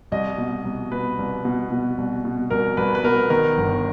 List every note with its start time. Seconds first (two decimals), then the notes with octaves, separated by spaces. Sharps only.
0.12 C2 D#5
0.38 B2
0.65 C2
0.92 B2 B4
1.19 C2
1.45 B2
1.71 B2
1.98 C2
2.25 B2
2.50 C2 A#4
2.77 C2 B4
2.95 B4
3.04 B2 A#4
3.30 D#3 A#4
3.58 G1